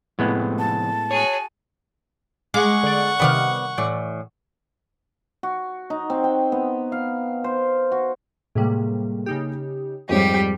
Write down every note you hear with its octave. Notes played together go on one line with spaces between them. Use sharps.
F2 A2 C3 G#3 B3
A5
F#4 G#4 C#5
G#3 F#5 C#6 D6
D3 D5
C3 D#3 G3 B3 D5 F5
A2 E3 D5
F#4
D#4
C4
G5
B3
F5
C5
F#4
A2 C3 G3 G#3 A#3
C#3 D#4 G4
F2 G#2 G3 G4 C#5 D#5